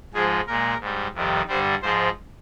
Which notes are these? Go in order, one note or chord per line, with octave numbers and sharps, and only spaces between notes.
G#2 F3 G#3 G#4
A#2 G#3 A#4
G#2 G3
F2 C3 D#3 G3
G2 D3 G3 C5
G#2 F3 G#3 C5